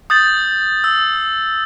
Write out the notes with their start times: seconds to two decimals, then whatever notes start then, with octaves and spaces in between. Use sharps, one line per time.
0.10 D#6 G6 A6 F#7
0.84 E6